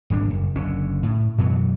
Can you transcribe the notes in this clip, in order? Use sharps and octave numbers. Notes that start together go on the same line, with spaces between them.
D#1 G#1 G3 D4
F#1
F#1 D3 C#4
A2
F#2 B2 E3 F#3